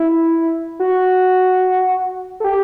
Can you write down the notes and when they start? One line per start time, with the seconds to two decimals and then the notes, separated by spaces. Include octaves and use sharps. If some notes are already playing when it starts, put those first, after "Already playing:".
Already playing: E4
0.80 F#4
2.40 A4
2.44 G4